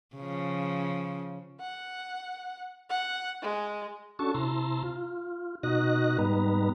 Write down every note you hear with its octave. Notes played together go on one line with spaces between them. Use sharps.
C#3 F3
F#5
F#5
G#3
C#4 D4 F#4 A4 A5 C#6
C3 E4 A5 A#5 C6
F4
B2 D#4 F#4 D#5 F#6 A#6
G#2 G3 B3 D#4 B4 A#5